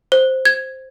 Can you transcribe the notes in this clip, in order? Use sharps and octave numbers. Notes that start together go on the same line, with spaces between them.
C5
G#6